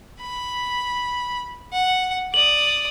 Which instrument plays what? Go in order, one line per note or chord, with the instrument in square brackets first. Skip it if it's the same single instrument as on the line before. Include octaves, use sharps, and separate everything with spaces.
[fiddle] B5
F#5
[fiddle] D5 D#6 [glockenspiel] F#7